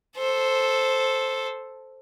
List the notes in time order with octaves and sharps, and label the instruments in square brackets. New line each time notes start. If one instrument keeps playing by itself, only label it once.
[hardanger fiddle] A4 C5